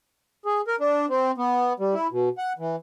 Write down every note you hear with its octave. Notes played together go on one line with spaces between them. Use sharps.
G#4
A#4
D4
C4
B3
G3
E4
B2
F#5
E3